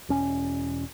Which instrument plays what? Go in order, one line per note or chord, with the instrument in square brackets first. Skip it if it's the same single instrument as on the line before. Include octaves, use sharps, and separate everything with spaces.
[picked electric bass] E1 C#4